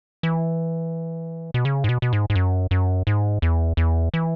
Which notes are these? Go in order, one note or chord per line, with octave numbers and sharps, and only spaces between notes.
E3
B2
C#3
G#2
B2
B2
G#2
G#2
F#2
F#2
G#2
E2
E2
E3